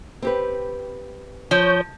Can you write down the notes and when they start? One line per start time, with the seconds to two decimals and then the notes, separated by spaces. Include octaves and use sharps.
0.22 C4 G4 B4
1.51 F3 C#5 G6